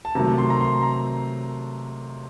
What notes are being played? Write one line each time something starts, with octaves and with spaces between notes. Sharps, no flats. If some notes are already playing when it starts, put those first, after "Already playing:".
A5
C3 D#3 F#3 A3 A#5
C6
A#5
C6
A#5